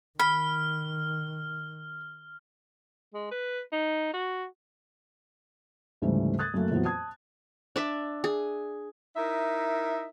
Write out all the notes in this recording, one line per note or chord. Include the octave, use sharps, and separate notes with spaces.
D#3 B5 F6
G#3
B4
D#4
F#4
D2 G#2 C#3 E3 G3 A3
D#6 F#6 G#6 A6
F#2 F#3 A3 A#3
F2 A#2 E3 F#3 B3
A5 D#6 G#6
D4 D5 E5
G#4
D#4 E4 A#4 E5